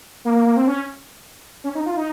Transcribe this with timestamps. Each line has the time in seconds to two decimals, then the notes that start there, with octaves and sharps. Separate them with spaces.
0.25 A#3
0.35 A#3
0.46 A#3
0.57 C4
0.67 C#4
1.64 C#4
1.75 D#4
1.86 F4
1.97 D#4